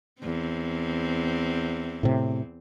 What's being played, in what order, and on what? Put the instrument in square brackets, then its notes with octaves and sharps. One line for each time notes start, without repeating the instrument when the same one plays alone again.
[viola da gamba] E2 C4
[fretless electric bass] A2 C3